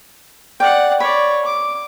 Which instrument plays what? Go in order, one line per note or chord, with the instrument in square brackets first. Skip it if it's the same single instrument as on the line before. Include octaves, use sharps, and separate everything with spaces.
[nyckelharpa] D5 F#5 [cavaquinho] G5
[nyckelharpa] C#5 D5 [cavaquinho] B5
[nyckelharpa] D6